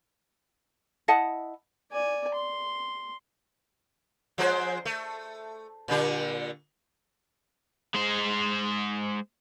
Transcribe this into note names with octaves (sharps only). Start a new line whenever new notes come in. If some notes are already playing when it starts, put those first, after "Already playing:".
E4 D#5 F#5 A5
D5 G#5
C6
F3 G#3 C5
A3
A#2 D3 G3
G#3 C5